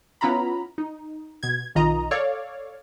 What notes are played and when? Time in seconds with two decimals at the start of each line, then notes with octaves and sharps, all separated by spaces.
0.21 B3 C#4 E4 F4 A#5 B5
0.78 D#4
1.43 B2 G#6
1.75 B1 D#3 F4 D#5 A#5
2.11 A4 C#5 D5 F5